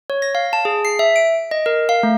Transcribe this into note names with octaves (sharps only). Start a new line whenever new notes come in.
C#5
A#6
F5
A5
G#4
C7
E5
D7
D#5
A#4
F5
A3